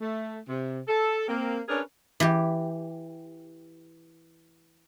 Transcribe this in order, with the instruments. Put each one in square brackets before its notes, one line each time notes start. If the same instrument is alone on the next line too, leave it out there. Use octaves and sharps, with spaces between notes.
[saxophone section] A3
C3
A4
A#3 C4
C#4 D4 G#4 A#4 B4 C#5
[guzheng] E3 G4